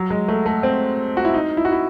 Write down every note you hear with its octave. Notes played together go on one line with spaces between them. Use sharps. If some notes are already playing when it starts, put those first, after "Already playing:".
Already playing: F#3
G#3
A3
A3
C4
F#4
E4
D#4
E4
F#4
E4